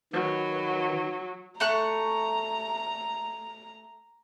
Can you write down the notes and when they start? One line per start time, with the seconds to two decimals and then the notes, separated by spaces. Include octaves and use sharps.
0.13 D#3 F#3 B4
1.60 A3 A#5 C#6 F#6